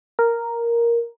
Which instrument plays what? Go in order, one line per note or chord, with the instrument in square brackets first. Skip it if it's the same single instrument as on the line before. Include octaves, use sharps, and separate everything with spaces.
[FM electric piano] A#4